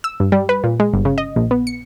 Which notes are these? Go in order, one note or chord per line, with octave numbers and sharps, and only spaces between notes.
E6
G2
G3
B4
A#2
G#3
G1
C#3
D#5
A#1
B3
C#7